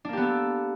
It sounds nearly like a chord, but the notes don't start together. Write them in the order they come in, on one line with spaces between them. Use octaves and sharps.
D4 A#3 G4 B3 A4